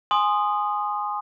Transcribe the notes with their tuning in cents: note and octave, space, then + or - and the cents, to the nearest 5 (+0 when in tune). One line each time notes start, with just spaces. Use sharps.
G#5 +0 C6 +0 D#6 -10